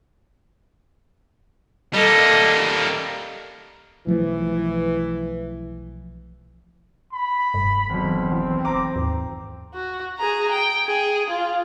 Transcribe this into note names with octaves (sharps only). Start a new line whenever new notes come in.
G3 A#3 A4 D#5
B1 E3 F3 A3
B5
F1 G2
B1 E2 C4
E3
F1 A#5 D6
D#2 G#2
F#4
G#4 A#5
G5
G#4
F4